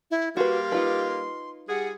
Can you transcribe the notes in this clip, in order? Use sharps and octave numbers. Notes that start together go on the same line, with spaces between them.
E4
G3 A#3 F#4 B4 F5 C6
D#4 F4 B4
G3 G#4 F#5